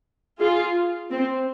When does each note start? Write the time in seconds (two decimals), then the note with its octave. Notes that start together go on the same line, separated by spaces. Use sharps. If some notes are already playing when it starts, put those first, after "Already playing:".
0.40 F4 G#4
1.11 C4